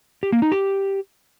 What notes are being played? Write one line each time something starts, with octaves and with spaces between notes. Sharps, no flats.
G4
A#3
D#4
G4